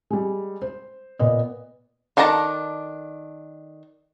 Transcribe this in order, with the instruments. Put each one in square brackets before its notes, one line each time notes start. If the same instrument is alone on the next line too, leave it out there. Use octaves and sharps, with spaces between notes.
[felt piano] G3 G#3
C5
A#2 B3 D#5
[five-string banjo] D#3 D4 A4 A5 A#5